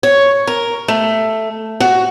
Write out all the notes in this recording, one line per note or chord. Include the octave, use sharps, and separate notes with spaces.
C#5
A#4
A3
F#4